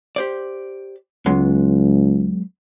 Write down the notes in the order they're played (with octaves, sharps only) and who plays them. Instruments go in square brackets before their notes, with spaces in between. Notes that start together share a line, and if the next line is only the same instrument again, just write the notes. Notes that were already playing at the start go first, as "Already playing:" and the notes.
[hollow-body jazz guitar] G4 C5 D5
[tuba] C#2 [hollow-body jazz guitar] F#3 G#3 B3